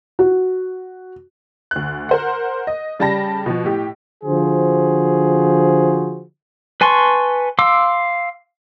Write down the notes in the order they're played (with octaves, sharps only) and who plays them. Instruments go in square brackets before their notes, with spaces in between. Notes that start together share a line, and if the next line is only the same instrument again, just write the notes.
[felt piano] F#4
[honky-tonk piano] D2 F#6
A#4 C5 F#5
D#5
C#3 G3 G5 A5 B5 A#6
B2 F3
A2 G4
[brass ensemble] D3 F3 F#4 G#4 C5
[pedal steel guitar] B4 G#5 A5 C6 C#6
F5 C6 D6 E6